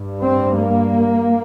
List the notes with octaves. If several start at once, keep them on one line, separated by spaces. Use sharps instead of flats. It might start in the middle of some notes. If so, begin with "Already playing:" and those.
Already playing: G2
C4
A#3